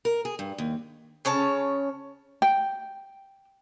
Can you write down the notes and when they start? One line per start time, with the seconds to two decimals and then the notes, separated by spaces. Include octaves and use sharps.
0.05 A#4
0.25 G#4
0.39 G2
0.58 D#2
1.25 C#3 C#4 C#5 A5
2.42 G5